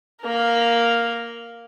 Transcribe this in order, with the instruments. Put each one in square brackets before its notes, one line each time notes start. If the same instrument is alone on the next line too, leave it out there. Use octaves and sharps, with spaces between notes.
[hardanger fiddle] A#3 A#4